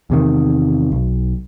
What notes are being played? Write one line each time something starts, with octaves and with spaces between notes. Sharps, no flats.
E2 C3 D#3
B1